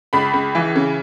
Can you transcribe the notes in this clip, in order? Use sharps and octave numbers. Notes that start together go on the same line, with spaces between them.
C#2 B5
C#2
E3
C#3